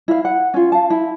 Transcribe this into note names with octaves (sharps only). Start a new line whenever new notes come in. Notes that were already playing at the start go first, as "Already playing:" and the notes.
E4 F5
F#5
C#4 F4
F5 A5
E4